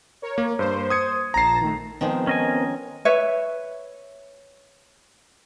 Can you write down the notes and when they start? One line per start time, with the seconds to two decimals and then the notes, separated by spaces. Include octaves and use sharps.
0.22 A#4 C#5
0.38 A#3
0.59 G2 A#3 C5
0.90 D#6 G#6 C#7
1.34 A#1 A5 A#5 A#6 C7
1.61 D#3 A3
2.01 D#3 F3 G#3 B3 C4 A#4
2.27 C#4 D#5 G#5
3.05 B4 C#5 E5